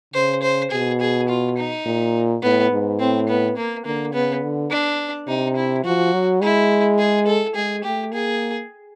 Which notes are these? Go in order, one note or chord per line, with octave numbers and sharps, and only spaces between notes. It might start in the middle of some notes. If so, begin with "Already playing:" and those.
C#3 C5
C5
B2 G#4
G#4
F4
D#4
A#2
A2 B3
G#2
A2 C4
B3
A#3
D3 A#3
C#3 B3
D3
D4
C3 D#4
E4
F3 F#4
F#3
G#3 E4
G#4
A4
G#3 G#4
A3 G4
A#3 G#4